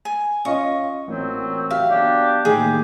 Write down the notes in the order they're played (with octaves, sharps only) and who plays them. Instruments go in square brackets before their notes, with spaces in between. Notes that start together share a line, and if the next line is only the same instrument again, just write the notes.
[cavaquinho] G#5
[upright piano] C#4 F4 D#5 [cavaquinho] C#6
[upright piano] A1 [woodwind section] A#2 F#3 C4
[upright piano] F#4 G4 E5 [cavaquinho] F5
[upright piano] F#3 B3 [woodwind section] D4 G4
[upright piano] A2 D#3 A#3 [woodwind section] G4 [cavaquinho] G#4